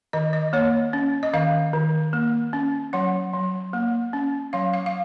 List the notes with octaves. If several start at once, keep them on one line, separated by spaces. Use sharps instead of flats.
D#3 D#5
D#5
A#3 C#5
C#4
D#5
D#3 F5
D#3
A#3
C#4
F#3 F#5
F#3
A#3
C#4
F#3 F5
F5
F5